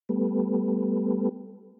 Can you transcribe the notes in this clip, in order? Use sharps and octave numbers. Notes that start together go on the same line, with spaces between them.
G3 A3 B3